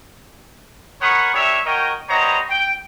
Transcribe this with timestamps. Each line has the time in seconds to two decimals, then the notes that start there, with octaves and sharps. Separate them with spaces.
1.01 A#4 C#5 F#5 B5 C#6 D#6
1.34 D4 G4 A#4 C#5 E5
1.66 F#4 A#4 C#5 D#5 G5
2.09 G3 B3 C5 C#5 D#5 A#5
2.49 G5